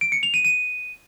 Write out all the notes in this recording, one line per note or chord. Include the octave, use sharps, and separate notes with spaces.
D7
C#7
F7
D#7
D#7